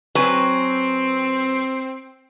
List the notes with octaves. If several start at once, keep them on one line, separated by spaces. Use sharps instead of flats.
F#3 C4 B4 G#5